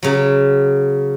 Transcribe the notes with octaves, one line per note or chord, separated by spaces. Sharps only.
C#3 F#3